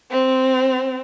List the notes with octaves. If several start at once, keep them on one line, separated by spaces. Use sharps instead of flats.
C4